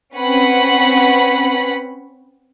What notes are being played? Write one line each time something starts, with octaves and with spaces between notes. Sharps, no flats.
C4 C#4 B4 F#5 B5